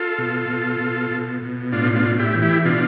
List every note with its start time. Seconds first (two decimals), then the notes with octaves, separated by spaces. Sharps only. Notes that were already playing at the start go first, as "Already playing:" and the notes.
Already playing: F4 A4
0.18 B2
0.49 B2
0.80 B2
1.11 B2
1.42 B2
1.72 A2 D4 F4
1.96 D4 F4
2.03 A2
2.19 E4 G4
2.34 E3
2.42 E4 G4
2.65 B2 D4 F4